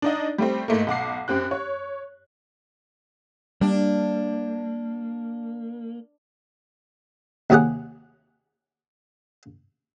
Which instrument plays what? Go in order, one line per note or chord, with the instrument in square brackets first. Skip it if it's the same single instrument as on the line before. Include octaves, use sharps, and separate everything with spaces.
[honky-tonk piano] D4 D#4 D#5
G3 A3 C4
G#2 A3 A#3
B1 F#5 D6 C7
F#2 C4 G4 F#6
C#5
[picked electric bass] G3 [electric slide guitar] A#3 [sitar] D4
[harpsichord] D#2 C3 F#3 G4 G#4 F#5